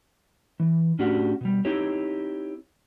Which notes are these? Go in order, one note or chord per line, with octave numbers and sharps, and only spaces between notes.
E3
A2 C#4 D4 F#4 G4 F#5
B2 G3
C4 D#4 E4 G4 C#5